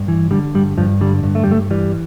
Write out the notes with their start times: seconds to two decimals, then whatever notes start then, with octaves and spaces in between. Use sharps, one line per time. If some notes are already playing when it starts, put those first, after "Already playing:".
Already playing: G2
0.08 E3
0.31 D3 G3
0.55 G2 G3
0.78 G2 F3
1.01 D3 G3
1.23 G2
1.35 A3
1.44 G3
1.47 G2 A3
1.71 E3 G3